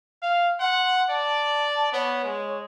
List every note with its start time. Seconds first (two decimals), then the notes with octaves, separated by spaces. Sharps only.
0.22 F5
0.60 F#5 C6
1.10 D5 A5
1.93 B3 C#5
2.24 G#3